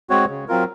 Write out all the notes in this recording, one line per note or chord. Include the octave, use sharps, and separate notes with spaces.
G#3 C4 F#4 C#5
C#3
F#3 C4 F4 A#4